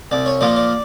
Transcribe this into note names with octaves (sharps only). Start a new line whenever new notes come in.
C2 D5
C#5
A#2 F3 A#3 D5
D5